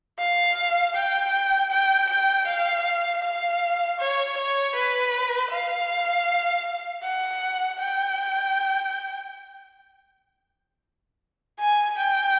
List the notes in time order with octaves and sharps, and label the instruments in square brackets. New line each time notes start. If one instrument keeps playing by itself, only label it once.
[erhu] F5
G5
G5
G5
F5
F5
C#5
C#5
B4
F5
F#5
G5
G#5
G5